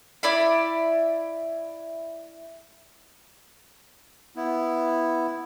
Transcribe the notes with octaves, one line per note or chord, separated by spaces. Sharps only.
E4 D5 E5 B5
B3 E4